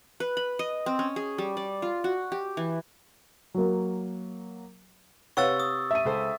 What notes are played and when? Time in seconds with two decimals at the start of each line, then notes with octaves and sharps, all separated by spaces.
0.20 B4
0.37 B5
0.59 D#5
0.86 C4
0.99 C#4
1.16 G#4
1.38 G3
1.57 D5
1.82 F4
2.04 F#4
2.32 G4
2.57 E3
3.54 F#3 A#3
5.37 C3 B4 C#5 F5 F#5 C#6 E6 A6
5.60 D#6
5.91 E5 D#7
6.05 C#2 A4 C5